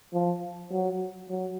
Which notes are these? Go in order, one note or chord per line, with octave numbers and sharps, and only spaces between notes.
F3
F#3
F#3